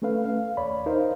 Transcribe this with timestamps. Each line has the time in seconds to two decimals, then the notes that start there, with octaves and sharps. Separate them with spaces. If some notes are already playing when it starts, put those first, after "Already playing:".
0.02 A3 C#4 A4 B4 F5
0.26 F5
0.57 D#2 C#5 D5 B5
0.86 D#4 A#4 C5 D#5 F5